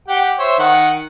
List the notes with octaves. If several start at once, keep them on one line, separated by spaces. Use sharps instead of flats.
G4 F#5 G5
C5 C#5 E5
D#3 F#5